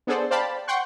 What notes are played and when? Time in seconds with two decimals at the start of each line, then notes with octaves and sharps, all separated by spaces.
0.07 B3 D4 G#4 A4 C5 D5
0.31 C5 D5 F5 G5 A5 B5
0.68 F#5 G5 C6 C#6 F#6